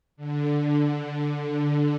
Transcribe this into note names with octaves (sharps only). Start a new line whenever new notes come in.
D3